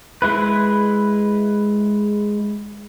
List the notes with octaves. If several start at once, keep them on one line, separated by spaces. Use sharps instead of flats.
G#3 E4 B4